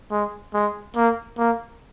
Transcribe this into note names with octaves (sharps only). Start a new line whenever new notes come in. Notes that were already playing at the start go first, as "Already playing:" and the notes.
G#3
G#3
A#3
A#3